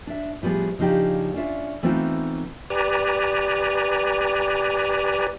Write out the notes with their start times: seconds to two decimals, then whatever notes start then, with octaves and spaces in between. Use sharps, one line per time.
0.07 D4 E5
0.42 A2 F3 G3 B3 G#4
0.79 C#3 F3 D4 D#4 G4
1.34 C#4 D4 F4 E5
1.83 E3 A3 B3 C4 D#4 F4
2.70 G4 B4 D5 G#5 A#5